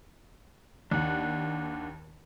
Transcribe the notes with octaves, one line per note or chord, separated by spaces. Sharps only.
D#2 D4 F#5